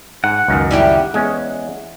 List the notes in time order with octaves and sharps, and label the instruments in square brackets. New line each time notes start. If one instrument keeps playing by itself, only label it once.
[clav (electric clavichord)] G#2 [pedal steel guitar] F#5
[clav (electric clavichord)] C#2 F#2 D#3
[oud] G3 E4 G4
[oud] E2 [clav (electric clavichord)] G#3 C#4